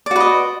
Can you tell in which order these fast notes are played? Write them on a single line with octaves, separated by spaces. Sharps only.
D5 F#4 B4 D#5